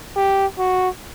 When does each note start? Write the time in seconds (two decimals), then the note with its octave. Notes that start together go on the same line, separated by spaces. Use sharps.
0.16 G4
0.58 F#4